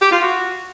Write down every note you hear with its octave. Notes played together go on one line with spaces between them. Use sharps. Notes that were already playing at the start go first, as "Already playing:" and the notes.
G4
F4
F#4